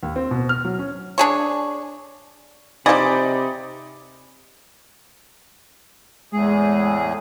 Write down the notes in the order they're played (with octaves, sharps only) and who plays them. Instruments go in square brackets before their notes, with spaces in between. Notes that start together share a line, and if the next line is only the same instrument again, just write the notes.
[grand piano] D#2
C4
B2
F6
F#3
C#4
[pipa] D4 G#4 C#5
[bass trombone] C3 [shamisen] F3 G#4 [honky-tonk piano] D#4 D5 [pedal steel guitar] B5
[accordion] E2 A2 G#4 [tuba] G#3